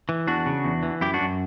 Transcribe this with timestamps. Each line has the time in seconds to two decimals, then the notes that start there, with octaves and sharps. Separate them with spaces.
0.09 E3
0.27 E2 D4 F#4
0.46 C#3
0.64 E2
0.83 E3
1.01 F#2 E4 G4
1.14 D4 F#4
1.20 F#2